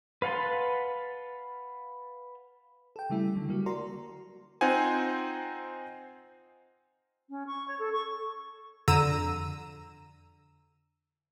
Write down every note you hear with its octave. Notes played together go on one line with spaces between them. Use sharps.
B4 F5 F#5 A5 C6
A4 G5
C#3 G3 A3 E4
D3 F#3
G3 A#3 F#4
F#4 A#4 D5 A#5 C6
C4 D#4 F4 C5 F#5 G#5
C#4
C#6
C#5
A4
C#6
F2 D3 A#5 E6 D#7